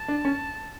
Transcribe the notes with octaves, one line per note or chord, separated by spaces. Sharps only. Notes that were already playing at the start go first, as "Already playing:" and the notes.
Already playing: A5
D4
C#4